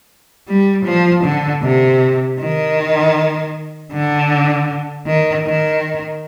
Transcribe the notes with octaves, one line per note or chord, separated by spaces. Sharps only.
G3
F3
D3
C3
D#3
D3
D#3
D#3